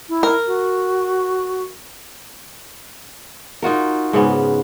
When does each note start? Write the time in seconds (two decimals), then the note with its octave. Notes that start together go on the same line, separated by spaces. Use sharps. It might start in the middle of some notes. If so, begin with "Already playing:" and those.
0.09 E4
0.23 A#4
0.47 F#4
3.62 D#4 F4 F#4 A#4
4.13 G#2 C#3 B3